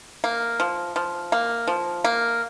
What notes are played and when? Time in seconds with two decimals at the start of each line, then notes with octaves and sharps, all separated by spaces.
0.24 A#3
0.60 F3
0.96 F3
1.32 A#3
1.68 F3
2.04 A#3